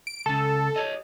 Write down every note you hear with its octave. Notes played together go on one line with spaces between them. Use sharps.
D7
C#2 C#3 A4
G4 C#5 D#5